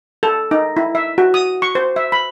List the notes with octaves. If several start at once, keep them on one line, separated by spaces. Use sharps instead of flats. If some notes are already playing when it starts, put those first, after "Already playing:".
A4
D#4
E4
E5
F#4
D#6
C#6
C5
E5
B5